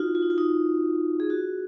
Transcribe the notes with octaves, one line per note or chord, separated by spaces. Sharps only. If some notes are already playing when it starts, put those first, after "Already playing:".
Already playing: D#4 F4 F#4
F4
D#4
F4
D#4
G#4
F#4